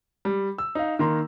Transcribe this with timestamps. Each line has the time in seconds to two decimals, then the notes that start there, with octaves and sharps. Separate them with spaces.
0.25 G3
0.58 E6
0.75 D#4 F5
0.99 D#3 A#3 A#5 C6